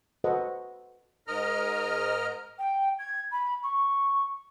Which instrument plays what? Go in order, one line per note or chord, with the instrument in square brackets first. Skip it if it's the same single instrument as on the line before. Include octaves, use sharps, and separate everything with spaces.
[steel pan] F#4 A4 B4 C5 D#5 F#5
[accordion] G#2 A#4 D#5 A#5 F6
[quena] G5
G#6
B5
C#6